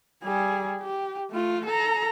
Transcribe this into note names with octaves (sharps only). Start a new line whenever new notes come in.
G3 G#4
G4
A3 F4
A4 A#5